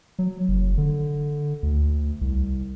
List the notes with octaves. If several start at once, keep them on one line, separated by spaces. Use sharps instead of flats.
F#3
F#1
D3
D2
C2